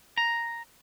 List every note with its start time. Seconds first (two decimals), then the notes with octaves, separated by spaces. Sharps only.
0.18 A#5